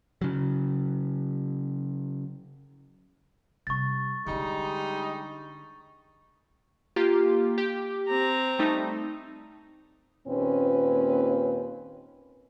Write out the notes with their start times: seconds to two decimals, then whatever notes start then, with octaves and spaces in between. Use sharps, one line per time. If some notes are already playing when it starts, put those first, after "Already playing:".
0.21 C#3 F#3
3.67 C3 G3 C#6 A6
4.26 D3 G3 G#3 D4 D#4
6.96 A#3 F4 G4
7.58 G4
8.08 C4 A#5
8.59 G3 A3 D#4
10.28 D#2 A#2 C4 C#4 B4